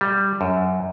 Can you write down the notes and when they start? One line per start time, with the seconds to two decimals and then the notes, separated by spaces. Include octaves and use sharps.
0.01 G3
0.41 F#2